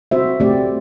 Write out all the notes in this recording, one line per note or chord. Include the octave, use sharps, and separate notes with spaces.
C4 F#4 C5 E5
A3 C4 G4 D5